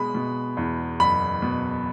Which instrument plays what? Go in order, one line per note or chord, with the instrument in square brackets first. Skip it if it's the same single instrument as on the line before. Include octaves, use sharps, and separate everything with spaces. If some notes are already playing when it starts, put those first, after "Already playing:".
Already playing: [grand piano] B2 G#3 B5
B2
E2
F#1 B5
B2